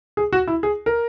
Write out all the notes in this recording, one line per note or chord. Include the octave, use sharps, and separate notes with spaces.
G#4
F#4
E4
G#4
A#4